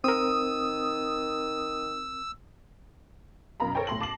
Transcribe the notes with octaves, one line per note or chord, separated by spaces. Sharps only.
D#3 C4 A#4 D#6 E6
F#2 B2 A#4 F5 A#5 B5
A4 A#4 C5 C#5 G5 A5
B1 A2 A3 C6 A#6 F#7
A5 D6 A#6 C7 F#7